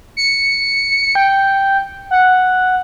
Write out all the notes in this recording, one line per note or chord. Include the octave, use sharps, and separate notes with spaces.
C#7
G5
F#5